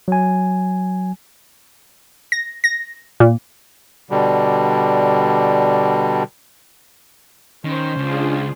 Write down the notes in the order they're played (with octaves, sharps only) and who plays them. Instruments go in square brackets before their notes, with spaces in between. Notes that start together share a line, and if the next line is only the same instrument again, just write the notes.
[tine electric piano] F#3 G#5
[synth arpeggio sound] A#6
A#6
A#2
[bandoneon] B2 D3 G3
[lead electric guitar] D#3 [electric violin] C#4 C5
[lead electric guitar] C#2 [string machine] D4 F4 G#4